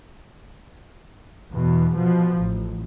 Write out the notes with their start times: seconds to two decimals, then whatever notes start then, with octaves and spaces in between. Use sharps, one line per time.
1.52 E2 B2
1.95 B2 F3
2.41 A1